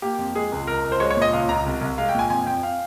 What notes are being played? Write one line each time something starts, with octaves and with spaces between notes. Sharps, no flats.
A#3 G4
F2
G#3 G#4
C#2
C#2 A#4
C#2
C5
G#3 C#5
C#5
A#2 D#5
C#2 F5
C#2 A#5
C2
C2
G#3 F5
G5
A#2 G#5
F2 G#5
F2 G5
F5